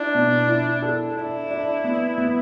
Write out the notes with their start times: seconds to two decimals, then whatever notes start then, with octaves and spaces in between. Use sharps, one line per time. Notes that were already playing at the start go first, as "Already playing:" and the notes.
Already playing: D4 E4
0.15 B2
0.48 E4
0.82 A4
1.16 D4 E4
1.51 D4
1.84 B3
2.18 B3